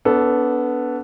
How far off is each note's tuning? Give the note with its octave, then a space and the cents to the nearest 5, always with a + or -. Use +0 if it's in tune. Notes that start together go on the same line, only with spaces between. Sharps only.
B3 +0 D4 -35 A4 +0